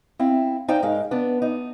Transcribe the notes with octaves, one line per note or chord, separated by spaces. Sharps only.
C4 E4 F5
D#4 C5 D5 F5 G5
G#2 G#3 A#4 F5
B3 D4
D#4